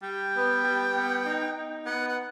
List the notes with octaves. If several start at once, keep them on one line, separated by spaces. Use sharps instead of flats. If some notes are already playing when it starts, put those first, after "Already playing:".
G3 G5
B3
G3
B3
D#4
D#4
B3 F#5
F#5